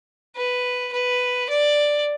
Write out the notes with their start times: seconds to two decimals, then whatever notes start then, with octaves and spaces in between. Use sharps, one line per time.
0.36 B4
0.93 B4
1.50 D5